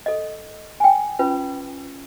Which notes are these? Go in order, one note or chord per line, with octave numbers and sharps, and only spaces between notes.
A4 D#5
G5 G#5
C#4 F4 B4